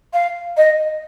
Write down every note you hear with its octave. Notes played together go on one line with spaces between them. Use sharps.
F5
D#5